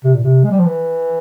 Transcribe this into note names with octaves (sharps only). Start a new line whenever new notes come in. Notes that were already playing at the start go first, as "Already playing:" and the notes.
C3
A#2
C3
G#3
G3
F3
E3